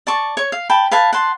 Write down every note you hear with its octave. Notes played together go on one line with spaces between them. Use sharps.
D5 A5 C#6
C#5 C#6
F5
G5 A5 B5
B4 F5 G#5 A5
F#5 A5 C6